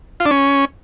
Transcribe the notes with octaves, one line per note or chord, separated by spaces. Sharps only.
F4
D4
C#4